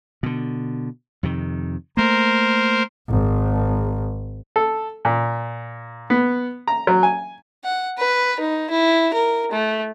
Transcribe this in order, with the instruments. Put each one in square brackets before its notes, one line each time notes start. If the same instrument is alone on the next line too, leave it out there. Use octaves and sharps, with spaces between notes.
[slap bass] B2 D3
F2 C3 D#3
[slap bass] A3 A#3 [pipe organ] A#4 C5
[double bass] G#1
[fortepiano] A4
A#2
B3
A#5
F#3
G#5
[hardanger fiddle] F#5
B4
D#4
E4
A#4
A3